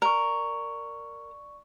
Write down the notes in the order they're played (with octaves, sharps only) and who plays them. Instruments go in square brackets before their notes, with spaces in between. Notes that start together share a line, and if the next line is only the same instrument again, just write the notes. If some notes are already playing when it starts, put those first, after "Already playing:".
[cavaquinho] A#4 [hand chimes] D5 C#6